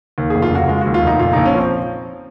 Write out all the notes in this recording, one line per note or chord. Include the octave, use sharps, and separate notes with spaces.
D#2
F1 G#4
F4
C#3 F#4
G#3 F4
D#2 F#4
F4
F1 D#4
A#2 F4
A#1 D#4
C#4
F3 C4